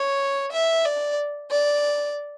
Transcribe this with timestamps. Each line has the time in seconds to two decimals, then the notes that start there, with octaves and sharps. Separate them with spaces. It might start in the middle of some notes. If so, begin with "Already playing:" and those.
Already playing: C#5
0.52 E5
0.85 D5
1.50 D5